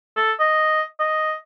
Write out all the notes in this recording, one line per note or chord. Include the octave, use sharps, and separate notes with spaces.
A4
D#5
D#5